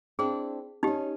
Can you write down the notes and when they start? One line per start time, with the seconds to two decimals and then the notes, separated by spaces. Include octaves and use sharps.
0.19 C4 D4 E4 G#4
0.83 C#4 D#4 G4 D#5